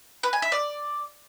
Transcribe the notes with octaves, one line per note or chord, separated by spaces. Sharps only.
B4
G#5
E5
D5